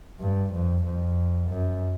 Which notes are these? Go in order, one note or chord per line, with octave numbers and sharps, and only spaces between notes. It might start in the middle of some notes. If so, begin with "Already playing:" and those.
G2
F2
F2
F#2